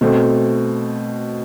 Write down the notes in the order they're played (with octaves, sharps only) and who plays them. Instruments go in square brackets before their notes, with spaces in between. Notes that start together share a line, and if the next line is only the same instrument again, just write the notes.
[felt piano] B2 A3 C4